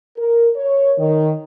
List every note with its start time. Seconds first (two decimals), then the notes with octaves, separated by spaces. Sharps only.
0.18 A#4
0.56 C#5
0.99 D#3